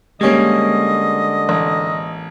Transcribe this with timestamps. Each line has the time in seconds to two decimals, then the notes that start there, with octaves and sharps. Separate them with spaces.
0.21 D3 G3 G#3 A#3 C#4 D#5
1.49 A1